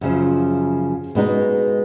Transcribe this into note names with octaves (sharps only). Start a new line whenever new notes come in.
F#2 C#3 F3
B2 G#3 B3 D#4